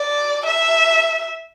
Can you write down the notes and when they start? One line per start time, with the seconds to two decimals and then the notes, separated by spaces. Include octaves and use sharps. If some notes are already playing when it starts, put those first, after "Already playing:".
Already playing: D5
0.46 E5